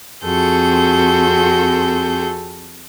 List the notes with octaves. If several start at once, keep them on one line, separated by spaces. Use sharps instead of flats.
F2 C4 F#4 G#4 A4 G6